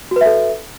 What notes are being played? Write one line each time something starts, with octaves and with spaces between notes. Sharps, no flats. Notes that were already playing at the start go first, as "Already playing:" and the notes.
F#4 A4 B4 E5